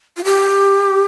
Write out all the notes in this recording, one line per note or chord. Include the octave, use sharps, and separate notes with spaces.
F4
G4